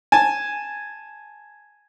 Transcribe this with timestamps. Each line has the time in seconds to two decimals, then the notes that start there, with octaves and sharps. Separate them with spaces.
0.12 G#5 A5